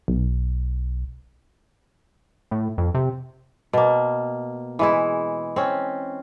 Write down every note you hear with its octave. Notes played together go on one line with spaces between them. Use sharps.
B1
A2
F2
C3
B2 A#3
E3 G#3 E4
C4 C#4